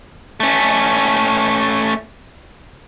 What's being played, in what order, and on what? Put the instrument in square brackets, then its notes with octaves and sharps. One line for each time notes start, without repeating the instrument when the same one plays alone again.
[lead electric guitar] A3 C#4